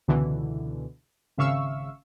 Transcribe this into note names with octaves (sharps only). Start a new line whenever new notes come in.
C#2 B2 D3 E3
G#1 C#3 E5 F5 C#6 E6